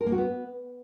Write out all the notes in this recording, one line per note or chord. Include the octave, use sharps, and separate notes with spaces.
A#4
A#3
F#4
B3